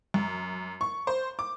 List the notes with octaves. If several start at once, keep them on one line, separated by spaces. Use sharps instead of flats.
F#2
C#6
C5
D6